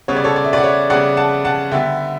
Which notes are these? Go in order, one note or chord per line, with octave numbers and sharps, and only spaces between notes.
C#3 G3 B3 C#5
D5
A4 C#5
D5
E5
B4 D5
F#5
C#5 E5
C#3 G3 B3 D5 F#5
F#5 A5
F#5 A5
D3 G3 B3 E5 G5